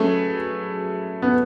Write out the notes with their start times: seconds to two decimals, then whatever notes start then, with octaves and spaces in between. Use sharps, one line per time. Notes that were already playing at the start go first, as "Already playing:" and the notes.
Already playing: F#3 A3 C#4 G#4 B4
1.22 B3